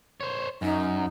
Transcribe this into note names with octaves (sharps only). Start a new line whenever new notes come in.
C5 C#5
F#2 D#4